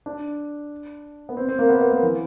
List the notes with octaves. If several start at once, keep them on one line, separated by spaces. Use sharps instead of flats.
D4
B3
C4
C4
A#3
B3
B3
A#3
E3